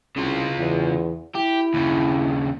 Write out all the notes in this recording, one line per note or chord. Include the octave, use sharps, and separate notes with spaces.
C2 C#3 F4
E2
E4 G4
D#2 C#3